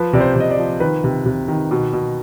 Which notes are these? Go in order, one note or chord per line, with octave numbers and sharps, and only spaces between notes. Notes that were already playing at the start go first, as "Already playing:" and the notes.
Already playing: F3 B4
C3 D5
C5
C3 D#5
D5
F3
D#3 B4
C3
C3
D#3
B2
B2